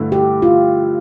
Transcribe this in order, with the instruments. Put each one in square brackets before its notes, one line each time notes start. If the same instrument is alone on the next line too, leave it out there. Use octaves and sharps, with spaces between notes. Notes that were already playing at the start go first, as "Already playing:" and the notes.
Already playing: [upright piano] G2 D3 A3 E4
[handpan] G4
F4